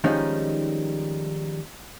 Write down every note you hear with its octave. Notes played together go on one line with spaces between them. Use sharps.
D#3 F3 G3 G#3 C#4 D#4